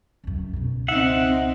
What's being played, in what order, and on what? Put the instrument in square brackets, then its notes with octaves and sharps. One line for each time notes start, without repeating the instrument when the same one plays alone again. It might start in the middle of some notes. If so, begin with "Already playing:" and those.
[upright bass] C#2 F#2
C#2 B2
[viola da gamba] C4 D#4 [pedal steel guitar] E5 F#5